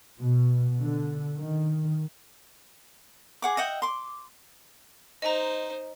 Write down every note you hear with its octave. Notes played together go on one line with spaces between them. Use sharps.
B2
D3
D#3
G#4 F#5 D6
D#5 E5 F#5 G5
C6 D6
D#4 C5 D#5 A#5